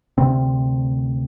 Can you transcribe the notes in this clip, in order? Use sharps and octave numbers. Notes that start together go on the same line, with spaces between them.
D2 C3 C4